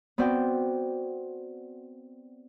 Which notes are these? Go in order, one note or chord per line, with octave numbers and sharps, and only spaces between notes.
B3 C4 F#4 D5 G5